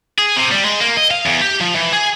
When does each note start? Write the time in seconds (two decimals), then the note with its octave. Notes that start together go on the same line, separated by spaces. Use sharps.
0.18 G#4
0.36 C3
0.51 G3
0.64 G#3
0.80 A#3
0.97 D#5
1.11 F5
1.26 E2
1.41 G4
1.61 F3
1.75 E3
1.93 G#4